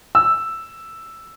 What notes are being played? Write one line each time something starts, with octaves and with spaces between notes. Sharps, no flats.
E6